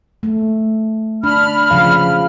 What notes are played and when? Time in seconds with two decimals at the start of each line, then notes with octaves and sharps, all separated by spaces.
0.23 A3
1.24 D4 B5 F6
1.71 C#3 F3 F5